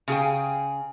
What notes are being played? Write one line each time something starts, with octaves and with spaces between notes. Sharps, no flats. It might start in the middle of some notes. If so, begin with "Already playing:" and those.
C#3 G#4 G5